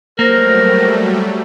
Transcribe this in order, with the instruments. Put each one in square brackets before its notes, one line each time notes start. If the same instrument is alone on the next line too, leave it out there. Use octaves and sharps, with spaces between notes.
[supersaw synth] F#3 G3 A3 [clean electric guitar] A#3 [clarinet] A#4 [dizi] C5